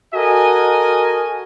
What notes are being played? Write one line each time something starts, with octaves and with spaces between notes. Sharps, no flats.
F#4 A4 A#4 D#5 G#5